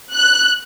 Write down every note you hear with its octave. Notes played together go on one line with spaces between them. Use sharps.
F#6